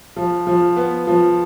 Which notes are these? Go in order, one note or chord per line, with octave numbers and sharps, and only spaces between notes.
F3
F3
B3
F3